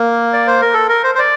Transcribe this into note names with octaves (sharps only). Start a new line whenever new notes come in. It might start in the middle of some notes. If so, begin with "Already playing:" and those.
Already playing: A#3
D5
C5
A#4
A4
A#4
C5
C5
D5